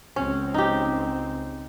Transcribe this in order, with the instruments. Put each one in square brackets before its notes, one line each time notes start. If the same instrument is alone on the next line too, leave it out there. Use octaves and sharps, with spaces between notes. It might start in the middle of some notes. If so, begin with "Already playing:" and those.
[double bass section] C#2 G#3 C4 [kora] C#4
[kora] D#4 G4